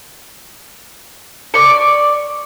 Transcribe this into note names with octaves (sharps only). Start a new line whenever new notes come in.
D5 C#6